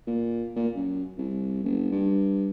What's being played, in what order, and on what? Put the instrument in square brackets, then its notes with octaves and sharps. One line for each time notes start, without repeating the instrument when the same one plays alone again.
[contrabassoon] A#2
A#2
F#2
C2
F#1
G2